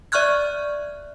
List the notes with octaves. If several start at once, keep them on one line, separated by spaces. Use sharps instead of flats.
D5 E5 C#6 F6 F#6 G#6